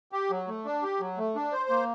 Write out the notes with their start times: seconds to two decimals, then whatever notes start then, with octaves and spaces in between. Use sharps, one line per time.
0.12 G4
0.31 F#3
0.48 A3
0.65 D4
0.82 G4
1.00 F#3
1.18 A3
1.35 D4
1.52 C5
1.69 A#3